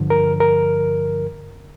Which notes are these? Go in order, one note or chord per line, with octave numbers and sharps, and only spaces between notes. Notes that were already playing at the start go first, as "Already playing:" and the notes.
Already playing: G2 D3 F3
A#4
A#4